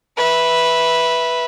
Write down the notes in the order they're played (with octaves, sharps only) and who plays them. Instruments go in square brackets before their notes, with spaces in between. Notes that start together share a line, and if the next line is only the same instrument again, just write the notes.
[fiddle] B4 E5